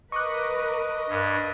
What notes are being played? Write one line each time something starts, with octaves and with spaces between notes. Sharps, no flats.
A#4 B4 D#5 C#6 D6 F#6
G2